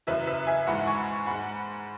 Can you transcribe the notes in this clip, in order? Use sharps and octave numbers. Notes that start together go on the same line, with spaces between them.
F#2 C#3 E3 B4 E5
B4 E5
E5 G#5
G#2 E3 G#3 F#5 B5
G#5 C#6
G#2 G#3 F#5 B5